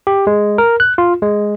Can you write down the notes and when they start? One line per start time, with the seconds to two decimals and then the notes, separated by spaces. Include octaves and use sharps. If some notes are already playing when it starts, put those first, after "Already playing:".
0.07 G4
0.27 G#3
0.58 A#4
0.80 F#6
0.98 F4
1.22 G#3